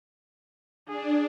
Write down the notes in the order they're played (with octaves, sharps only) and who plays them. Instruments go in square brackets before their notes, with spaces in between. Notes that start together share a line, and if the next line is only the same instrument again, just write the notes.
[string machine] D4 [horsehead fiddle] G#4